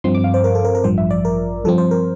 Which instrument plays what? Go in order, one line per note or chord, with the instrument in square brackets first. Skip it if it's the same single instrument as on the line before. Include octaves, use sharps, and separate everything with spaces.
[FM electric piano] G2 F3 C4 C6
D6
F5
C5
A#4
A4
A#4
A#4
A1 G2 F3 C5
E5
D5
A#4
G2 F3 C4 A4
C5
A#4